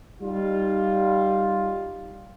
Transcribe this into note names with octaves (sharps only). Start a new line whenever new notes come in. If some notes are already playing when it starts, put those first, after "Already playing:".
G3 D#4 F4